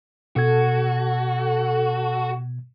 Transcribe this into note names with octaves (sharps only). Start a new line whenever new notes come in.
B2 F#4 A4 G#6